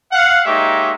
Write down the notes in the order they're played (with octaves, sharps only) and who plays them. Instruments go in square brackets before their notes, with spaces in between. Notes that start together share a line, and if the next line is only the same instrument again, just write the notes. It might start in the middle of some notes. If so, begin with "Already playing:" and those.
[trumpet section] F5 F#5
G#3 A#3 D#4 G4 C#5 E5